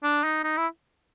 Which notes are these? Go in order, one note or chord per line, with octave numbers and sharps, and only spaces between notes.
D4
D#4
D#4
E4